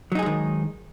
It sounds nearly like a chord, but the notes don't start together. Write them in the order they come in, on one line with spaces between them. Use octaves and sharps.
F#3 D#4 G#4 G#3 D#3